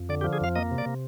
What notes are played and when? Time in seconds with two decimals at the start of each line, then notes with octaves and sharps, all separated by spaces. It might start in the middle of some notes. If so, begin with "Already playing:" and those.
Already playing: F2
0.09 D3 D5
0.21 G4
0.24 F3
0.33 G#4
0.41 F2 F5
0.56 A#3 D#5
0.71 C3
0.78 D5
0.86 C3